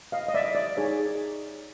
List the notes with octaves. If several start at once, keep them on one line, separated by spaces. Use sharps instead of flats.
D#5 F5
D#5
D5 E5
D5
D#4 G#4 C#5